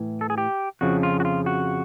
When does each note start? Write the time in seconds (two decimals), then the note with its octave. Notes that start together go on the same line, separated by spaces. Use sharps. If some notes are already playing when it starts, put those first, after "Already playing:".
Already playing: A2 E3
0.21 A4
0.30 G#4
0.38 G4
0.81 F2 C#3 F3 F#4
1.03 F4
1.20 F#4
1.25 F4
1.46 F#4